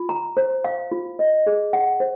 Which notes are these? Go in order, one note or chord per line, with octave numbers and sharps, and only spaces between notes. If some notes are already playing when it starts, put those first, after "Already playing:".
Already playing: F4
A#5
C5
F5
F4
D#5
G#4
F#5
C5